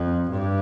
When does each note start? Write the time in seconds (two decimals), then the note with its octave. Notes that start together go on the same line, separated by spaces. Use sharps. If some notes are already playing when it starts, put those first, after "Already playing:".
Already playing: F2
0.31 G2